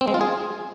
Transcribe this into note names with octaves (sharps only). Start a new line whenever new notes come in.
C4
G#3
F4
G#4